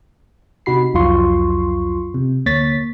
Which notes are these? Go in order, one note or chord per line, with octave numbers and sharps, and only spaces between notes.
C3 D#4 F#4 B5 C7
C2 F2 F#3 F4 C6 C#6
C3
D2 A#3 C#5 A6 B6